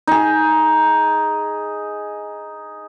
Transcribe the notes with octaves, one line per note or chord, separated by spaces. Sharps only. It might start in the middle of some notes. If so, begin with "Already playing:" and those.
D#4 G#4